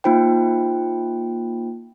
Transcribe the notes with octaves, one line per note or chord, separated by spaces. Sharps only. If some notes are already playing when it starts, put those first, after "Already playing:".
A#3 D#4 F4 C5 G5